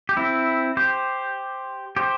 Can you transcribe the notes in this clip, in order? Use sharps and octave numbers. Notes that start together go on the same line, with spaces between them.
G4
C4 E4
G4 C5
G4 C5